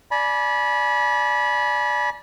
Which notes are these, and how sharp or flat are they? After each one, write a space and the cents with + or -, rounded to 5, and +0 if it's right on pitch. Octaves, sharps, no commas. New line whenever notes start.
D5 +0 G#5 +35 B5 -25